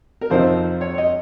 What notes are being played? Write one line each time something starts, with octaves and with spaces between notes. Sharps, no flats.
A#4
F2 C3 F3 C4 D#4 C5
C#5
C#5
D#5